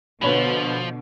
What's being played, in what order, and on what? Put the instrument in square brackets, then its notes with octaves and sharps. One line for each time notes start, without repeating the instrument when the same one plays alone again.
[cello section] B2 D3 [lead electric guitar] F3 [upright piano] B4 C#5 B5